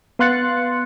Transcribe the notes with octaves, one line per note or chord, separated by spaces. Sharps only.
B3 F5 C6 F#6 A6 C#7